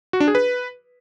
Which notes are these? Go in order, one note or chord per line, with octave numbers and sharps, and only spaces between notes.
F#4
D4
G#4
B4